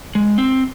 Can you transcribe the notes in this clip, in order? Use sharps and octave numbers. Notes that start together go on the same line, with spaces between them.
G#3
C4